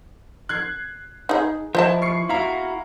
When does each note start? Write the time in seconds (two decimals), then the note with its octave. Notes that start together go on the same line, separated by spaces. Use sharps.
0.49 F#6 G#6 C7
1.29 D#4 G#4
1.75 F3 E4 C5 D#5 A5
2.02 C#6 C7 C#7
2.29 E4 F#4 F5 A#5